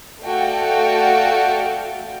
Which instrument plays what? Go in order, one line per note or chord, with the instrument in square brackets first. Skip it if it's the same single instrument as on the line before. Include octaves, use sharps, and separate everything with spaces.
[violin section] A3 F#4 A4 D5 F5 G5